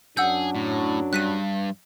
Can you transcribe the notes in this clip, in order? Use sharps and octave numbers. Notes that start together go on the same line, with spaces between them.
F#2 F#3 D4 G#4 F#5 E6 G6
A2
G2 F#6 B6 D#7